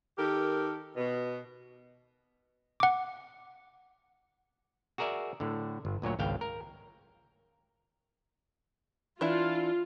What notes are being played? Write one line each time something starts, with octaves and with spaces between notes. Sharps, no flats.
D#3 G4 A4 A#4
B2
F#5 D6
F#4 G#4 A#4 D5 E5
A2 D3
G1
D2 A#2 F#3 C#5
G#1 C#2 F5 G5
A#4
E3 D4 E4 F4